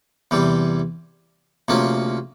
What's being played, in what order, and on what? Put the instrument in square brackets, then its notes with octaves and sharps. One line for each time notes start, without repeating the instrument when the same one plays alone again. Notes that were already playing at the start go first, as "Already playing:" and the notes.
[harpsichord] E2 C3 E3 G3
D2 C3 F3 A#3 C#4